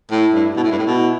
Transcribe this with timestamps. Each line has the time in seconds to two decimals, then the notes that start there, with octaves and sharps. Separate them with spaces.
0.11 A2 E4
0.34 G2
0.56 B2 E4
0.63 A2
0.71 G2
0.78 A2
0.87 B2